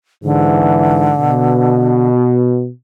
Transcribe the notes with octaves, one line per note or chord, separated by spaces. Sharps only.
G#2 D3 E3
B2